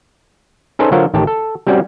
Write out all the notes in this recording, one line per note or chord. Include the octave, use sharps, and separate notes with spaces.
C#4 D#4 G#4 A4 B4 C5
D3 F#3 F4 F#4 A#4 C5
A1 D#3 G4 A5
A4
G3 C4 C#4 F#4 D5